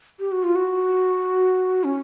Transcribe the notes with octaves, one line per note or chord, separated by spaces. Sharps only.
G4
F#4
F4
F#4
C#4